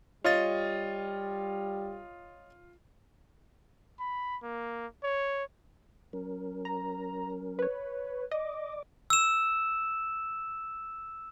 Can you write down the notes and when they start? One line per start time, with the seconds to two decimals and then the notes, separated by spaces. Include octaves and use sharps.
0.25 G3 F4 C#5 D#5 A6
4.00 B5
4.43 A#3
5.03 C#5
6.13 F#3 C#4 A#4
6.65 A#5
7.59 B4 C#5
8.31 D5 D#5 D6
9.10 E6 E7